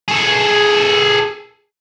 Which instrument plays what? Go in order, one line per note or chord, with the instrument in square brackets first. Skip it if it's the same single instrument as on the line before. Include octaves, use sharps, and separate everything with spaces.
[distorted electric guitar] G#4 A4